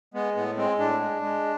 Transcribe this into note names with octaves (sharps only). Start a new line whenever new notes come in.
G#3 B3
A2 B3
G#3 C4
A2 D4
G#3
G#3